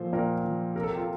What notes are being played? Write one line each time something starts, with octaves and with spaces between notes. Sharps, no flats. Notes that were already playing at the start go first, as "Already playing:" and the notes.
Already playing: A#2 F3 A4 C5
A#2 G4 A#4
F3
C3 A#4
A4
G4
F4 A4